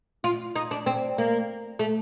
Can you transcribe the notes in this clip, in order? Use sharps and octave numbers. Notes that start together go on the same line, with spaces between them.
F4
D#4
D4
C4
A#3
A3